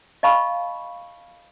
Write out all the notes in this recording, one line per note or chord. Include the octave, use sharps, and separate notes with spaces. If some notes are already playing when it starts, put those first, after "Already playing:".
D#5 F5 A5 B5 C#6